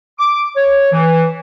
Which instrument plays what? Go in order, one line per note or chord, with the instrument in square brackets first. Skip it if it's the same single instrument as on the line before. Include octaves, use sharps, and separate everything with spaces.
[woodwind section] D6
C#5
E3